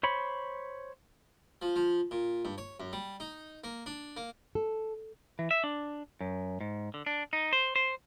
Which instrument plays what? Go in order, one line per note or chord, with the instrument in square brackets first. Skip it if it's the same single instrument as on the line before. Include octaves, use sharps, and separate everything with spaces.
[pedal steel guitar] C5 C#5 B5
[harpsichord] F3
F3
A#2
G2
C#5
F#2
G3
D#4
A#3
D4
A#3
[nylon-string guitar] A4
[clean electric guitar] E3
E5
D4
F#2
G#2
D3
D4
D#4
C5
C5